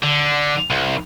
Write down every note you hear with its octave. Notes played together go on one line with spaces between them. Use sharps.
D3
C2